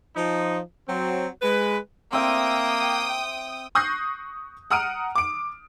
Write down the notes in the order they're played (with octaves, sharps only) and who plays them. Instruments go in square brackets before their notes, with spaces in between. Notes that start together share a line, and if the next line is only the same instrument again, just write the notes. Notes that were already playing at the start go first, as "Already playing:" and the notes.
[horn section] F3 D#4
F#3 C4
G#3 B4
[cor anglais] A#3 [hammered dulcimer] C4 E5 [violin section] G5 D#6
[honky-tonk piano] C#6 D#6 F#6 G6 A#6 C7
F#5 A#5 D#6 F6 D7 D#7
D6 D7